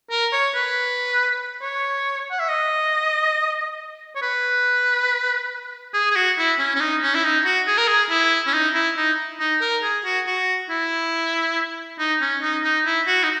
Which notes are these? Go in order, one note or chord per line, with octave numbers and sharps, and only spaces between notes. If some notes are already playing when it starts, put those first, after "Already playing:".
A#4
C#5
B4
C#5
F#5
E5
D#5
C#5
B4
G#4
G#4
F#4
E4
C#4
C#4
D#4
C#4
E4
D#4
F#4
G#4
A#4
G#4
E4
C#4
D#4
E4
D#4
D#4
A#4
G#4
F#4
F#4
E4
D#4
C#4
D#4
D#4
E4
F#4
D#4